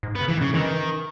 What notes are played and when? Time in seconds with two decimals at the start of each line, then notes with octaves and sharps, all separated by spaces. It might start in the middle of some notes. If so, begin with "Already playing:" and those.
0.03 G#2
0.16 B3
0.21 C#3
0.28 E3
0.37 D#3
0.41 C#3
0.54 D#3 E3